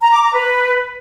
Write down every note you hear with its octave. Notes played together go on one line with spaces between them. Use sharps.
A#5
D6
A#5
B4